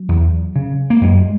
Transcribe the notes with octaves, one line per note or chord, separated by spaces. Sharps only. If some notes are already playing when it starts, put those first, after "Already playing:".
Already playing: F#3
E2
C#3
A#3
F#2 G#3